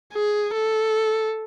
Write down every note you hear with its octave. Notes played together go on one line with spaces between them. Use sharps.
G#4
A4